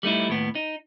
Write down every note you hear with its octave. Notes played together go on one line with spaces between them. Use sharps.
G3 A3 D#4 E4
D#2 A2 B3
D#4